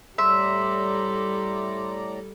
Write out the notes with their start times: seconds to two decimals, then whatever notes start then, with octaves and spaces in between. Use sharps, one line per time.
0.18 A2 G3 A4 D5 E5 A#5 C6